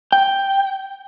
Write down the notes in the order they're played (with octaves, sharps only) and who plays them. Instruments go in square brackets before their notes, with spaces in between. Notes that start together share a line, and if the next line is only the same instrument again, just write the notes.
[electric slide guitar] G5